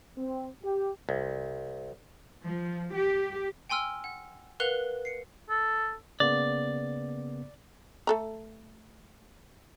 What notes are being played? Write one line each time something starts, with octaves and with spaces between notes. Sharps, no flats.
C4
G4
C2
F3
G4
G5 G#5 C6 E6 F6
F#5
A#4 B4 F5 F#5 F#6 F7
C7 C#7
A4
C#3 A#3 B3 D5
A3 A4 A#5